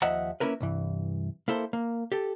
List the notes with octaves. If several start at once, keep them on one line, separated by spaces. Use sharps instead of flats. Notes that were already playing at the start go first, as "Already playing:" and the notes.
D#2 F3 D#5 E5 F#5 A#5
A#3 C#4 E4 A#4 B4
C2 G2 E3
A#3 E4 A4 C5
A#3
G4 A4